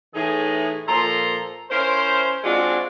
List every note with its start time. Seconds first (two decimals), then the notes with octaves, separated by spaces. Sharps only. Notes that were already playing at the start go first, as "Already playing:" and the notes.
0.14 A2 E3 D#4 G#4
0.87 A#2 F3 A4 A#5 C6
1.70 C#4 E4 A#4 C5
2.43 G#3 C4 D4 F4 F#4 A4